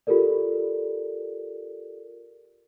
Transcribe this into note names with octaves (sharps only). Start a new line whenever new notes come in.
F4 G4 A4 A#4 D5